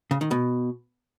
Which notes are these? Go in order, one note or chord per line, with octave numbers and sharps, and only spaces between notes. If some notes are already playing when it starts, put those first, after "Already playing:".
C#3
D#3
B2